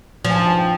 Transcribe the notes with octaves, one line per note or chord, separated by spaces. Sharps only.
F3 G#5
A5
G#5
G5